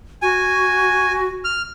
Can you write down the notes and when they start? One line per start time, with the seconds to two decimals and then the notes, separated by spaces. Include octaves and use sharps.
0.22 F#4 G#5
1.45 F6